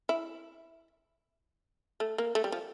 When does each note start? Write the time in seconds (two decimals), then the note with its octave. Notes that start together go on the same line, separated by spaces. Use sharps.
0.09 E4
2.00 A3
2.18 A#3
2.35 A3
2.44 G3
2.52 F3